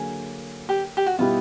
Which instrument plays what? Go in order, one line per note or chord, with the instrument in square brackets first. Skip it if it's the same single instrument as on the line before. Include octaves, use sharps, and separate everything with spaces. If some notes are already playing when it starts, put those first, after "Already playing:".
Already playing: [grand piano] D3 F#3 A#3 [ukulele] G#4
[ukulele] G4
G4
F#4
[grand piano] B2 G3 B3 E4 G4 [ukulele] F4